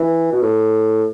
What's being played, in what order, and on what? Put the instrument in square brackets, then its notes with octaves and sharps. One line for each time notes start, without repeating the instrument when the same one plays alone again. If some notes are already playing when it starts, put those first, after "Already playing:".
Already playing: [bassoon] E3
B2
A2